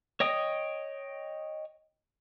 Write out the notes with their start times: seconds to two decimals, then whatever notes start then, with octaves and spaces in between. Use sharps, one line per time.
0.20 C#5 D#5 G5 D#6